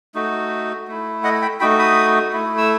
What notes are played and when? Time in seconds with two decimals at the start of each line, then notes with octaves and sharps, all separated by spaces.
0.15 A3 D#4 F#4
0.88 A3 E4
1.24 D#5 F#5
1.42 G5 B5
1.60 A3 D#4 F#4 G5 B5
1.79 B5 D#6
2.33 A3 E4
2.58 E6